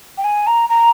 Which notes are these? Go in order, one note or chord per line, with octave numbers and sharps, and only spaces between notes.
G5
G#5
A#5
A#5